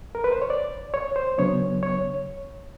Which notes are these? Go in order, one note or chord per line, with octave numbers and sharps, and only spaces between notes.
A#4
B4
C5
C#5
D5
C#5
C5
C#3 F#3 B3 D4 C#5
C#5